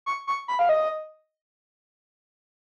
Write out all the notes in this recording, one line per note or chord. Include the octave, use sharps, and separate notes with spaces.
C#6
C#6
B5
F5
D#5